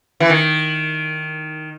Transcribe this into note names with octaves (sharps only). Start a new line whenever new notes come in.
E3
D#3